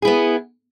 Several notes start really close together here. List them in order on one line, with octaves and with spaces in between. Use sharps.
G#4 E4 B3